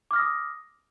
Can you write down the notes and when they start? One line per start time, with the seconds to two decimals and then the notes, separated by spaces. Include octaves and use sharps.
0.11 D6
0.13 F6
0.16 A#6
0.19 D#6